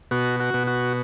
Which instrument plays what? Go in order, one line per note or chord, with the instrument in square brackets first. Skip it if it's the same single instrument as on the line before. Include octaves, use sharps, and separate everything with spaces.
[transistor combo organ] B2 F#4
F#4
B2
F#4